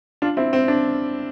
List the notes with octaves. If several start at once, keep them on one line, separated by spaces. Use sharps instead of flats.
D4 F4
C4 E4
C4
D4